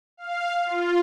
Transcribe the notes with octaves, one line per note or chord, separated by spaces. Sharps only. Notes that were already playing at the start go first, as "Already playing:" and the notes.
F5
F4